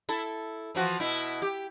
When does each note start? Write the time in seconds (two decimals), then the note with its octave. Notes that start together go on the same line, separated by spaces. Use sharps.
0.09 E4 A4
0.75 E3 F3 F#4
1.00 B2 E4
1.42 G4